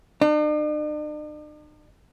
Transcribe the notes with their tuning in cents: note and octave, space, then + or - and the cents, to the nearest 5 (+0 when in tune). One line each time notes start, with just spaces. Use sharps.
D4 +45